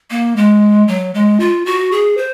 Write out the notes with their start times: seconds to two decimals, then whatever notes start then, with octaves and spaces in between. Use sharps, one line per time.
0.11 A#3
0.37 G#3
0.88 F#3
1.14 G#3
1.40 F4
1.66 F#4
1.92 G#4
2.18 C5